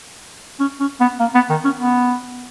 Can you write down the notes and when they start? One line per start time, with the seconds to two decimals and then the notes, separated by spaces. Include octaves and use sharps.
0.60 C#4
0.80 C#4
1.00 B3
1.20 A#3
1.35 B3
1.50 D#3
1.65 C#4
1.80 B3